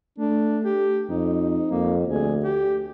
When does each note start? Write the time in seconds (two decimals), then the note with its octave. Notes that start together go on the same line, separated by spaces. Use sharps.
0.18 A3 D4
0.65 G4
1.09 F2 D#4
1.71 F2 A#3
2.08 D2 G#4
2.44 G4